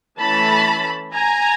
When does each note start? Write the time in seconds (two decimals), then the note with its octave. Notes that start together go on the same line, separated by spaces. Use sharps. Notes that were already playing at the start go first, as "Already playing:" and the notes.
0.19 E3 A3 C#4 A5 B5
1.13 G#5 A#5